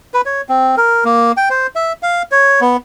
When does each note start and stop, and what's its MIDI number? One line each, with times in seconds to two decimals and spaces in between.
0.14 0.21 71
0.26 0.41 73
0.49 0.75 60
0.77 1.04 70
1.05 1.32 58
1.37 1.49 79
1.50 1.67 72
1.76 1.93 76
2.03 2.22 77
2.32 2.60 73
2.61 2.77 59